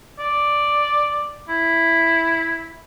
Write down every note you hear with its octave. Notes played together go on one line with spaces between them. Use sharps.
D5
E4